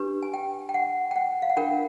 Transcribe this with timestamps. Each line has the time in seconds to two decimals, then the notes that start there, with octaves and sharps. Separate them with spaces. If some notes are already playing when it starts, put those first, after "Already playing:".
Already playing: D4 G4 B4
0.23 G#5
0.34 G5
0.69 G5
0.74 F#5
1.11 G5
1.16 F#5
1.42 F5
1.50 F#5
1.57 D4 F4 A#4 G5